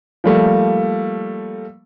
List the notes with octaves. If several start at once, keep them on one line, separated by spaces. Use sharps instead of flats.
F3 G3 A3 A#3